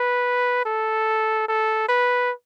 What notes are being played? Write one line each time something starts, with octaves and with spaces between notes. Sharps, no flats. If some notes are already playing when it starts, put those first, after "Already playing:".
Already playing: B4
A4
A4
B4